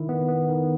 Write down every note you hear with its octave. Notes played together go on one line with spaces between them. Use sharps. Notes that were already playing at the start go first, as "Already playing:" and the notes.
Already playing: D#3 E4
B3
B3
D#3